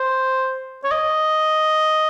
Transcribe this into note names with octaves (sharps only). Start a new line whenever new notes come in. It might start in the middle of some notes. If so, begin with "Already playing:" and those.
Already playing: C5
C#5
D#5